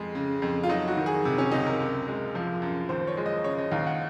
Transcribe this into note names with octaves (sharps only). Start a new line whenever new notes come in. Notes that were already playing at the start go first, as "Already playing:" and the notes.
Already playing: F2 G#3
C#3
F2
F4
F#3 D#4
F#4
D#3
G#4
C3
C#4
C#2 D#4
A#4
F#2
G#3
F3
F#2
D#2 C5
C#5
G#3
D#5
C#3 C#5
D#5
D#2 F5
F#5